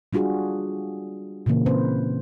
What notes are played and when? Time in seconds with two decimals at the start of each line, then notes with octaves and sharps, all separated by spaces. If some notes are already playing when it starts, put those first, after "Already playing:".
0.13 G3 D4 F4 F#4 G#4
1.46 A#2 C#3 E3 A#3
1.66 C4 B4 C5